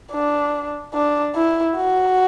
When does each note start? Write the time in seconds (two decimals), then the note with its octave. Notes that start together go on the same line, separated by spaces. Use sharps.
0.12 D4
0.94 D4
1.35 E4
1.76 F#4